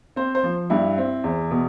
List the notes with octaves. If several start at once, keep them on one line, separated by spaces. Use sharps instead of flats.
C4 C5
C5
F3
G2 E4
C4
E2
B2